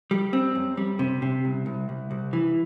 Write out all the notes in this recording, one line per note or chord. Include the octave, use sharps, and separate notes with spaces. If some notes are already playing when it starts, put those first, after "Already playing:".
G3
C4
F#2
G3
C3
C3
C2
C2
C2
C2
E3